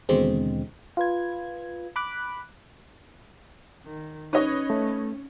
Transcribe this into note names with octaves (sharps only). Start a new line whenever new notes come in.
D#2 B2 D3 E3 G#3 C4
F4 B4 G#6
B5 D6 F#6
D#3
C#4 D#4 G4 B4 C#5 D#5
A3